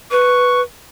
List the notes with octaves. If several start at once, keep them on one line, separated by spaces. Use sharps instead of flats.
B4 C#6